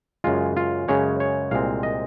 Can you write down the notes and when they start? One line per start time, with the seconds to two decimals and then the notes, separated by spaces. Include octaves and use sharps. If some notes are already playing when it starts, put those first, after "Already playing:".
0.24 F#2 C#3 G#3 F4
0.57 F4
0.88 F#2 C#3 G#3 C#5
1.20 C#5
1.51 C2 A#2 G#3 C4 F5
1.83 D#5